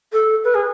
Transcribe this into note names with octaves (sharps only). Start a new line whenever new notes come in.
A4
B4
G#4